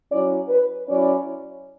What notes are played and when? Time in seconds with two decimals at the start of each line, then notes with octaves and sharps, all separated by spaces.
0.11 F#3 C#4 E4 D5
0.49 B4
0.88 F#3 C#4 E4 D5